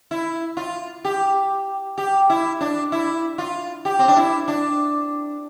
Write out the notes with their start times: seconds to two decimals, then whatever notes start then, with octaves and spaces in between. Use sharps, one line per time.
0.11 E4
0.57 F4
1.05 G4
1.98 G4
2.30 E4
2.61 D4
2.92 E4
3.38 F4
3.85 G4
3.99 C4
4.08 D4
4.17 E4
4.48 D4